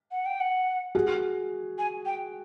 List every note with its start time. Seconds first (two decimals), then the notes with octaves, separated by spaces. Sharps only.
0.11 F#5
0.26 G5
0.40 F#5
0.95 F#4 G#4
1.78 G#5
2.06 G5